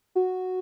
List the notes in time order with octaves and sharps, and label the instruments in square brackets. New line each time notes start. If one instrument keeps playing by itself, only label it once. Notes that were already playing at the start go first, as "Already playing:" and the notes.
[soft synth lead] F#4